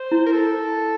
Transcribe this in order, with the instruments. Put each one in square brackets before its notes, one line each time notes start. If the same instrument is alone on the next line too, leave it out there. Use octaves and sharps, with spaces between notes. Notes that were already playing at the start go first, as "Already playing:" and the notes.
Already playing: [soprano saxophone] C5
[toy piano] E4
[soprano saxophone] A#4
A4